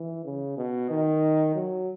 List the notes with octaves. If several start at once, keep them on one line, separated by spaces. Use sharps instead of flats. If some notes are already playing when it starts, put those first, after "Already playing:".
Already playing: E3
C#3
B2
D#3
F#3